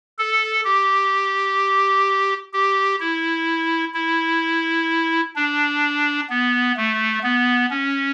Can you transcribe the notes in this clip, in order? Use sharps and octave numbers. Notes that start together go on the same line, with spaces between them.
A4
G4
G4
E4
E4
D4
B3
A3
B3
C#4